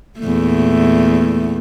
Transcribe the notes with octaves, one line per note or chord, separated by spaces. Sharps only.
E2 A#2 A3